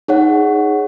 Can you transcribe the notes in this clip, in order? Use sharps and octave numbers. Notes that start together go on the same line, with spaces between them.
D#4 G#4 C#5 F#5